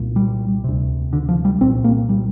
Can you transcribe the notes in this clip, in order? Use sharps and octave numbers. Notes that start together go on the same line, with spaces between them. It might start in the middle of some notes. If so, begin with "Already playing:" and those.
Already playing: C2 A#2
G3
D2 C3
D3
F3
G3
C2 A#2 C4
A#3
G3